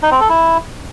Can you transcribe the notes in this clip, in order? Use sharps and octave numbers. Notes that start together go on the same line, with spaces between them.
D#4
C4
A4
E4